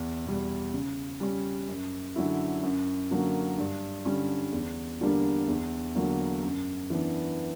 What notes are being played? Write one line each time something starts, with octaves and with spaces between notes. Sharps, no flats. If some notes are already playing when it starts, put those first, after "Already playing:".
Already playing: E2
B2 G3
C#3
G3 C#4
F#2
D3 F#3 C#4 E4
F#2
D3 F#3 A#3
G2
D3 G3 C#4
E2
D3 G3 A#3 D4
E2
D3 F#3 A#3
F#2
E3 B3 D4